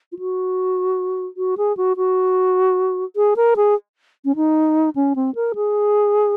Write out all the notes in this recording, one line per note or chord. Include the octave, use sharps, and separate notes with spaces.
F4
F#4
F#4
G#4
F#4
F#4
G#4
A#4
G#4
C#4
D#4
C#4
C4
A#4
G#4